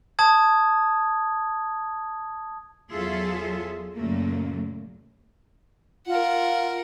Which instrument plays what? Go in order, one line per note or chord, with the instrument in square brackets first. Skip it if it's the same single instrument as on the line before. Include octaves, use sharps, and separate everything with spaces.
[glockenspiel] A5 D#6 G#6
[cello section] E2 F#3 F4 G#4 A4 E5
F#2 A#2 C#3 A3 A#3
[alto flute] F4 [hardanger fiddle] A#4 F#5